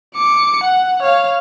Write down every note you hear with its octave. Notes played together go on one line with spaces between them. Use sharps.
D6 C#7
F#5
C#5 F5